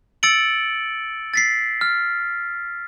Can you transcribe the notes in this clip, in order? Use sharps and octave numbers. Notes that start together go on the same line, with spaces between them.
E6 A6 C#7 D7 F#7
A6 B6 C7
F6